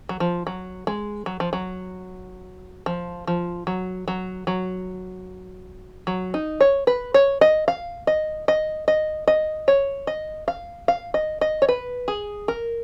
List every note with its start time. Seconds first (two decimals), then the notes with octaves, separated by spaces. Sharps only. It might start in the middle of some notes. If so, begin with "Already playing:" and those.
0.09 F#3
0.20 F3
0.47 F#3
0.87 G#3
1.26 F#3
1.40 F3
1.53 F#3
2.86 F3
3.27 F3
3.67 F#3
4.08 F#3
4.47 F#3
6.07 F#3
6.34 D#4
6.61 C#5
6.87 B4
7.14 C#5
7.41 D#5
7.68 F5
8.07 D#5
8.48 D#5
8.88 D#5
9.28 D#5
9.68 C#5
10.07 D#5
10.48 F5
10.88 F5
11.14 D#5
11.41 D#5
11.62 C#5
11.69 B4
12.08 G#4
12.48 A#4